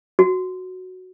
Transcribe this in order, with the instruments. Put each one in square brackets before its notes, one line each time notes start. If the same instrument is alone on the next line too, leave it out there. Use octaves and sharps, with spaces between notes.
[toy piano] F#4